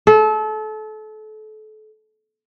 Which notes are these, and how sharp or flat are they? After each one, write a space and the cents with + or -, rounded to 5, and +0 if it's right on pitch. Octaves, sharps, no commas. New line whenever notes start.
A4 -30